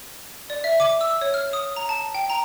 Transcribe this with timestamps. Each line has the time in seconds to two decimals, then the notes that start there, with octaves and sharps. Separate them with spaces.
0.50 D5
0.64 E5
0.80 D6
1.01 E6
1.22 C#5
1.34 F6
1.53 D#6
1.76 A#5
1.89 A5
2.15 G5
2.30 A#5